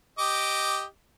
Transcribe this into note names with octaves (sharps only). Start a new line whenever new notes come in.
G4 D#5 D6